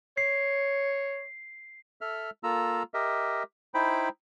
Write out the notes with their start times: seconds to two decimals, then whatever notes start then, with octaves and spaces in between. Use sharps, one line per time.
0.18 C#5 C7
2.01 A4 E5 F6
2.43 A#3 F4 A4 A#5 E6
2.94 G4 A#4 D#5 E5
3.74 D#4 E4 C5 G5 B5